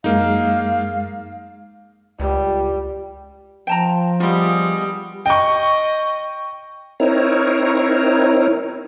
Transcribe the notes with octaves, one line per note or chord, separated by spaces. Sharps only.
F#2 G#3 A#3 D#4 F5
C#2 G3
F3 G5 A5 A#5
G3 B3 F4 G#4 D#5
D#5 G5 C#6
C4 D#4 E4 A#4 C#5